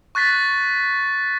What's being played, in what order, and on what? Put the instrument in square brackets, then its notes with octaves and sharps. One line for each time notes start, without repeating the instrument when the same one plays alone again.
[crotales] C#6 F#6 A6 B6